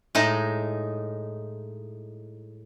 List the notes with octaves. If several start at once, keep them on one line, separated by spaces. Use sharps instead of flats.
A2 G#3 D#4